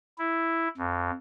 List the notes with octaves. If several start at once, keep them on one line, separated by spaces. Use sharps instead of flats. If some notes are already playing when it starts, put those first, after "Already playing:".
E4
F2